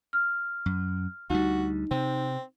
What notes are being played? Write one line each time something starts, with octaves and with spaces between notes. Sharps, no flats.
F6
F#2
D2 G3 D#4 F#4
C3 C4